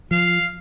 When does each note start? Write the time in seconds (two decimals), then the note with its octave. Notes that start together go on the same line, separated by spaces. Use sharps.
0.11 F3 F5